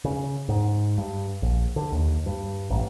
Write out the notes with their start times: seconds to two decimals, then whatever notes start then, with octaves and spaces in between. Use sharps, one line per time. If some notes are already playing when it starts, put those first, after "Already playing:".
0.04 C#3
0.49 G#2
0.98 G2
1.42 A#1
1.76 D3
1.92 D#2
2.26 G2
2.70 A1